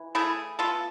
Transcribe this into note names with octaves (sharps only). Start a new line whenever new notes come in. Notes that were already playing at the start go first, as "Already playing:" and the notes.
Already playing: E3
A3 E4 G#4
B3 F4 A4